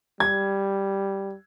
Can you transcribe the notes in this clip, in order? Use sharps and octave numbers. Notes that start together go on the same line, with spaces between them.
G3 G#6